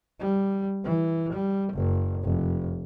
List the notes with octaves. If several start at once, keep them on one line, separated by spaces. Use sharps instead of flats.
G3
E3
G3
F#1
F1